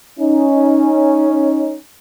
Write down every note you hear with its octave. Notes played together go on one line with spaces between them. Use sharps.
C#4 D#4